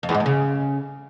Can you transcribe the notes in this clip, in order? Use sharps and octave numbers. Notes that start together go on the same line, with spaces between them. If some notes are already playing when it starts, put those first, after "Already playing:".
F2
E2
G#2
E2
C#3